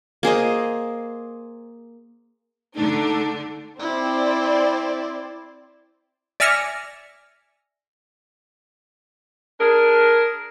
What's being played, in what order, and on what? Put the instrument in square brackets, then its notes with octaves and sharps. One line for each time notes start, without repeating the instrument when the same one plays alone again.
[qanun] A#3 G#4 C5 D#5
[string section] D3 A3 D4 [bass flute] D#4
[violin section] C4 C5 D5 [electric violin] E4
[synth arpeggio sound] D5 E5 G#5 F6 A#6 C#7
[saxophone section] D4 G#4 A#4